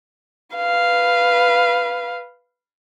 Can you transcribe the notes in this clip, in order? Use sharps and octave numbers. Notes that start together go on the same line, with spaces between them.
B4 F5